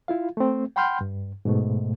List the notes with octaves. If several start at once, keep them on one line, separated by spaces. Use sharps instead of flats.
E4 F4 F5
A3 C4
F#5 G5 B5 C6 F6 G6
G2
G#2 B2 A3